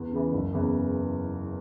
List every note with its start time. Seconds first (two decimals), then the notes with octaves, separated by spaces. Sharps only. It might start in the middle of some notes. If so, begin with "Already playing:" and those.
Already playing: E2
0.12 C#3 E3
0.32 F#1
0.53 E2 C#3 E3